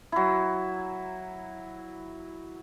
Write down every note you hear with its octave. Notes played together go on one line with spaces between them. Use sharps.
F#3 E4